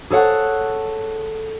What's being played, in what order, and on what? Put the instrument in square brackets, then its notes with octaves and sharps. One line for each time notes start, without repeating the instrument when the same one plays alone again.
[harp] G#4 A4 C#5 F#5